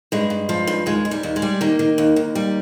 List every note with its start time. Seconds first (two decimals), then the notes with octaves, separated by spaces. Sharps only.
0.12 G2 G#3
0.30 G2
0.49 F3
0.67 G2
0.86 D#2 G#3
1.05 D#2
1.11 G3
1.23 D#2
1.36 G#3
1.42 G3
1.61 D#3 A#3
1.79 D#3
1.98 D#2
2.16 D#2
2.35 G3